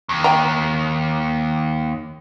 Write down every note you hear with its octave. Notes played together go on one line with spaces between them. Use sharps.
D#2
G5 A#5